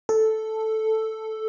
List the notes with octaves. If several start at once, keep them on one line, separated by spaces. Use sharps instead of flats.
A4